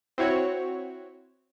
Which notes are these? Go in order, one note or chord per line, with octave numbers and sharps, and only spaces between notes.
C4 E4 F#4 C#5